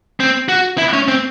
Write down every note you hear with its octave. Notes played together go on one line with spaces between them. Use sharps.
C4
F#4
E4
C#4
C4